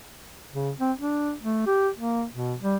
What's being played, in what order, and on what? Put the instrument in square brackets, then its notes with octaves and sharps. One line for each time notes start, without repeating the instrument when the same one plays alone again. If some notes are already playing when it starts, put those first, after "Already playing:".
[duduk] C#3
C4
D4
A3
G4
A#3
B2
G3